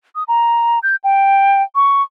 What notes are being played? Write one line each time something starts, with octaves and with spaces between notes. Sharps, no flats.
D#6
A#5
G6
G5
C#6